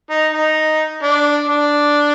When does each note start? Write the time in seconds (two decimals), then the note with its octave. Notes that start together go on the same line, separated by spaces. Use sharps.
0.11 D#4
0.33 D#4
1.03 D4
1.49 D4